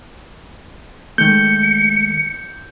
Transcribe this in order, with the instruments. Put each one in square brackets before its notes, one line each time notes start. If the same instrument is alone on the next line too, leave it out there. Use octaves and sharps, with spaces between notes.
[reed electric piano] D#3 G#3 A3 [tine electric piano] G6 [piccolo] C#7